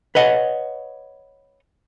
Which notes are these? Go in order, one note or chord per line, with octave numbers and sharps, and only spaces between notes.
B4 C#5 D#5 F#5